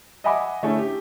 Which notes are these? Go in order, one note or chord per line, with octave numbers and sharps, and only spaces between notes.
D#5 E5 F#5 G#5 B5 D6
D3 A3 C#4 E4 G#4
G4